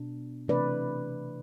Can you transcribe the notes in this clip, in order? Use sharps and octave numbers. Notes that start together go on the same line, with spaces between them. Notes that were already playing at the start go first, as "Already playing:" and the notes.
Already playing: B2 D4
C3 E3 A3 D4 B4 D5